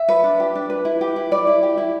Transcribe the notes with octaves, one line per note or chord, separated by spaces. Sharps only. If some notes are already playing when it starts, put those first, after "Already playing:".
Already playing: E5
B4
D4
G4
D4
B4
E4
G4
E4
B4 D5
E4
G4
E4